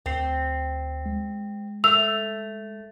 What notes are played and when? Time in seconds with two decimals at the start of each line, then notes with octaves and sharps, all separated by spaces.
0.06 D2 C4 C7
1.06 G#3
1.84 A3 E6 F7